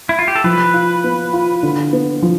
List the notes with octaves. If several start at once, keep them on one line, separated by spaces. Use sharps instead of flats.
E4
F4
G4
A4
F3 B4
F4
B3
F4
D3
B3
F3